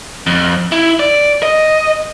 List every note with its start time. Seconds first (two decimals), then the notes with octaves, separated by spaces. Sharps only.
0.27 F2
0.72 E4
0.99 D5
1.43 D#5